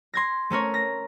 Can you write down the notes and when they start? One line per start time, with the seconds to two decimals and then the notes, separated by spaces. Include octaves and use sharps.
0.14 C6 G#6 A#6
0.50 A3 C#4 A#4 C#5
0.74 A#6